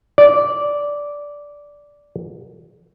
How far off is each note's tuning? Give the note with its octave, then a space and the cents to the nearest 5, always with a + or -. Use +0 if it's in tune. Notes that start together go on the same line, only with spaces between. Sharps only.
D5 -10